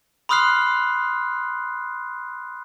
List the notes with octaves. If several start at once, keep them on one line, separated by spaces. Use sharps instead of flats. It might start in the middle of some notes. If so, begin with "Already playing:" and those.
B5 C6 D#6 F6 F#6 C7